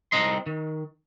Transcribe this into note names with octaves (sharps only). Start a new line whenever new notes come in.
C2 C4 D#4 D#5 C6
D#3